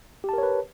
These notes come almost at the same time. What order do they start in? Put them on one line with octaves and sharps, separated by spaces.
G4 A5 A#4 C#5 B4